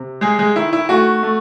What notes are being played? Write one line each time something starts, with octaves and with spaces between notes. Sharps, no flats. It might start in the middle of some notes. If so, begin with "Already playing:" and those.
Already playing: C3
G#3 G#4
G#3 G#4
D#3 E4
E4
A3 F#4
A3